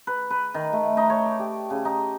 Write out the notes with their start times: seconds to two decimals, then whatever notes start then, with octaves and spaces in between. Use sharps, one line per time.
0.07 B4
0.30 B4
0.54 D#3
0.73 A3
0.97 D#4
1.10 C#5
1.26 D5
1.39 G4
1.70 C#3
1.85 D#4